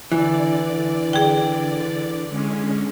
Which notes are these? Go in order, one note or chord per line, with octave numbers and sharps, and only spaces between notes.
D3 E3 D5
G#4 G5
D3 G#3 C#4